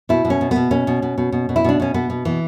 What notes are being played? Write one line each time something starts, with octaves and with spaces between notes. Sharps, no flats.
B2 E4
B2
C#4
B2
B2 B3
B2 C#4
B2
B2
B2
B2
B2
E4
B2 D4
B2 C#4
B2 B3
B2
B2 E3